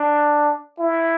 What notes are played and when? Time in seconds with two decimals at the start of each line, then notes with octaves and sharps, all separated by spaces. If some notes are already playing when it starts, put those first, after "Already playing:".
Already playing: D4
0.79 E4